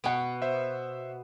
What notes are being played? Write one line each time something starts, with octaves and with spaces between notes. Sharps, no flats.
B2 B3 F#5 D7
C5 E5